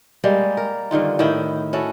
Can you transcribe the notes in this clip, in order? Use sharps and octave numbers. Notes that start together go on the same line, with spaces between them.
G3 G#3 A#3
A#4
G2 D3 D#3 F4
A2 D#3 E4 G5
C#4 E4 F#4 A4